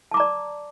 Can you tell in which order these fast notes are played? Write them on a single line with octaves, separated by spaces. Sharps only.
A5 D6 A#5 D5